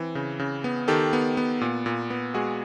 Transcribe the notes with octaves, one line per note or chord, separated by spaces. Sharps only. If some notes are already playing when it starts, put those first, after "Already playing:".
Already playing: E3 C4
C#3
C#3
B3
D#3 G4 A4
B3
B3
A#2
A#2
B3
G#3 F#4 G#4